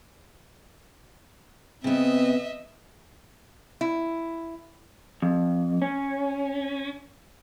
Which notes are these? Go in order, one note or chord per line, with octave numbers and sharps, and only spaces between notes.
C#3 B3 C4 D#5 E5
E4
F2
C#4